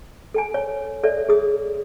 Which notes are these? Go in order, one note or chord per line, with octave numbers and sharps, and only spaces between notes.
A4 G5 G#5
C#5 G#5
A4 C#5 D5 E5
G#4 D#6